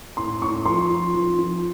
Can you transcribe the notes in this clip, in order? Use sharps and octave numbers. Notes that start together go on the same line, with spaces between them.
A2 C6
A2 C#6
F3 C6
F3
F3
F3